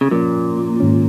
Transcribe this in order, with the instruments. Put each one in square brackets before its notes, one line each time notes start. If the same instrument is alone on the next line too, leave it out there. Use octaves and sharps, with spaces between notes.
[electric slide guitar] C#3
[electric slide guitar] A#2 [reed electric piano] F3 A#3 C#4
[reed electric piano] G#2 D#3 G#3 C#4